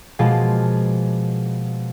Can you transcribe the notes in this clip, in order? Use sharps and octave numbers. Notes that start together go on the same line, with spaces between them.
B2 F3 G#3 A#3 F4